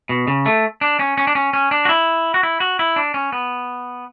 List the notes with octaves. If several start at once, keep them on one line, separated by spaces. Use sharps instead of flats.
B2
C#3
A3
D4
C#4
C#4
D4
C#4
C#4
D4
F#4
E4
F#4
E4
F#4
E4
D4
C#4
B3